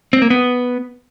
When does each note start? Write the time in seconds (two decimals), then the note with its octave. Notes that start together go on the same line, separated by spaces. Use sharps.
0.13 C4
0.22 A#3
0.30 B3